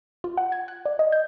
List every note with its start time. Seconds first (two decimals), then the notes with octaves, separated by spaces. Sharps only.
0.24 F4
0.37 F#5
0.52 G#6
0.68 F#6
0.85 D5
0.99 D#5
1.12 G6